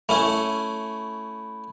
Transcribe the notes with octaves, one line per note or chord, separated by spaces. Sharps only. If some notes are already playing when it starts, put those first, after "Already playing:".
A3 C#4 E4 B5